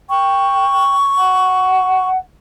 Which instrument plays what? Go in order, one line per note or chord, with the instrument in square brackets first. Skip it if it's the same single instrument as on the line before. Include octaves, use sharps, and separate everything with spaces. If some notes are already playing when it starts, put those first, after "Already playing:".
[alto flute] G5 [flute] C#6
[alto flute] F#5